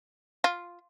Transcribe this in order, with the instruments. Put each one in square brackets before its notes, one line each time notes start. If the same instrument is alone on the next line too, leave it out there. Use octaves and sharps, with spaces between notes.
[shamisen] F4